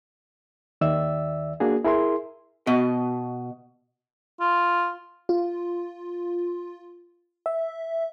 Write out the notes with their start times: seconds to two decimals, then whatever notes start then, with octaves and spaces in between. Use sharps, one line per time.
0.81 D#2 D#3 D5 E5 E6
1.60 A#3 D4 F#4 G#4
1.84 E4 G#4 A#4 E5 C6
2.67 B2 D#5
4.40 F4
5.29 F4
7.46 E5